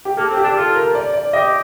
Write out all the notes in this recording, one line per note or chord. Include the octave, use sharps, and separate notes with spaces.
G4
A#3 A4
C4
G4
D4
F4 A4
A#4
D5
D5
G4 D#5